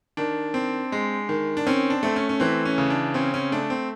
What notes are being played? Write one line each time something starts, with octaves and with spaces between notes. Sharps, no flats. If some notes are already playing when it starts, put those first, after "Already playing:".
D#3 D4
C4
G#3
D#3
D4
C4 C#4
D4
A3 C4
C#4
C#4
E3 C4
C#4
C#3
D4
C4 C#4
C#4
A3 D4
C4